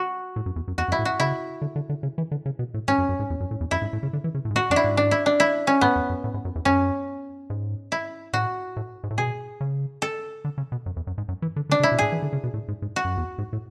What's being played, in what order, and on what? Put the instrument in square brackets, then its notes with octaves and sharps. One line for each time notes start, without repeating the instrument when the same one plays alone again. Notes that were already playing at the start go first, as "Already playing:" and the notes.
Already playing: [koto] F#4
[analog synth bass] A2
F#2
E2
F#2
[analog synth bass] E2 [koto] F#4
[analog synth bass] F#2
[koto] E4
[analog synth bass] A2
[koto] F#4
[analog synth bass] C#3 [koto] E4
[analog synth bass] D3
D3
D3
C#3
E3
D3
C#3
B2
A2
[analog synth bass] G#2 [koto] C#4
[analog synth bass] F#2
F#2
G#2
E2
F#2
A2
E2
[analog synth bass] F#2 [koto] E4
[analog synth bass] G#2
A2
C#3
D3
E3
C#3
A2
G#2
[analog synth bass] A2 [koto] F#4
[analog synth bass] F#2 [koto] D4
[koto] E4
[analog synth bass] G#2
[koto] D4
E4
D4
E4
C#4
[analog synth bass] G#2 [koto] B3
[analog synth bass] E2
F#2
A2
G#2
F#2
E2
[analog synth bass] F#2 [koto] C#4
[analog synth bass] G#2
[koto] E4
[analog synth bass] A2 [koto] F#4
[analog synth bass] A2
G#2
A2
[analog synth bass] B2 [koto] G#4
[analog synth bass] C#3
[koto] A4
[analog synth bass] D3
C#3
B2
F#2
E2
F#2
G#2
F#2
E3
D3
[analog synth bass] D3 [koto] D4
[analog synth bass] C#3
[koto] E4
[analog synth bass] B2
[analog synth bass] A2 [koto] G#4
[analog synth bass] E3
D3
C#3
B2
A2
G#2
G#2
[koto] F#4
[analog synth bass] F#2
E2
G#2
A2